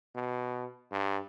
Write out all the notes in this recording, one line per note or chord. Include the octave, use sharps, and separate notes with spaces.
B2
G2